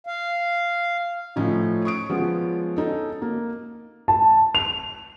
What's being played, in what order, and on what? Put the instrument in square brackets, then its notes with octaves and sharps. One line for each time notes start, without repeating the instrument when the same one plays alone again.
[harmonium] F5
[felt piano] A2 F3 C#4 D#4
C#6 D#6 D7
F3 G#3 B3 C#4
C#4 D#4 A4
A#3
[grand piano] A5
F7